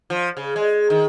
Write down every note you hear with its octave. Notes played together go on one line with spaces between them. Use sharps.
F3
C#3
G#3
D#3